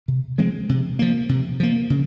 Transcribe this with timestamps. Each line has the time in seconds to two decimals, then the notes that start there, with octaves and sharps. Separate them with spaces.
0.08 C3
0.38 F3 G#3 C4
0.69 C3
0.99 F3 A#3
1.29 C3
1.60 F3 A#3
1.90 C#3